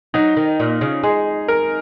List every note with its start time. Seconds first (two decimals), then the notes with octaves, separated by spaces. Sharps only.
0.14 F#3 D#4
0.37 D#3
0.60 A#2
0.81 C#3
1.03 G#3 G#4
1.48 A#4